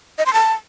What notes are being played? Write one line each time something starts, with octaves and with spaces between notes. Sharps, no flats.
D#5
C6
A5